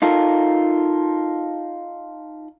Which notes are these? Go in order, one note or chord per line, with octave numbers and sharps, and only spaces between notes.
D#4 F4 A4 A#4